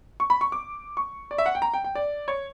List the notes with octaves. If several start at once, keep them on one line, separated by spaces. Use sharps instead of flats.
C#6
B5
C#6
D6
C#6
D5
E5
F#5
G5
A#5
G5
G5
D5
C#5